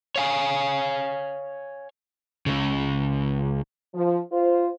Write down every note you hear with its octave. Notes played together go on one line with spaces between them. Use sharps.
C#5 F5 G#5
C#2 C#3
F3
F4 C5